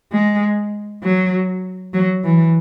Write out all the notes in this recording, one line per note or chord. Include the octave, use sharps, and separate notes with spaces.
G#3
F#3
F#3
E3